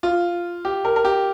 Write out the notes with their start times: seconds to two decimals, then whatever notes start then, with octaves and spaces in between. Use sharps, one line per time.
0.03 F4
0.65 G4
0.85 A#4
0.96 A#4
1.05 G4